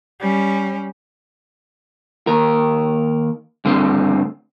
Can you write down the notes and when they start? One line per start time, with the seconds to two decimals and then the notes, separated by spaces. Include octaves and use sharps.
0.20 G3 C#4
2.27 D#2 A#4
3.65 G2 D3 A3 C4